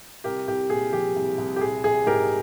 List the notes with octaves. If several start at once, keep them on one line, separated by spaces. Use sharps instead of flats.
C2 G4 A#4
C2 G4
A#2 G#4
F3 G4
C2
C2
G4
A#1 G#4
A#1 G#4
G#2 G4 A#4